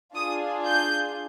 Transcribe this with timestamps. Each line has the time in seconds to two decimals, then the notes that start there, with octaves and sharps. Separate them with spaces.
0.15 D4 F4 G#4 D#6
0.65 G6